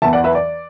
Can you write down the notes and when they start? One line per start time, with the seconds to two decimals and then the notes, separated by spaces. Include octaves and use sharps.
0.02 E2 E3 E5 A5
0.13 D5 F#5
0.24 B4 E5
0.35 D5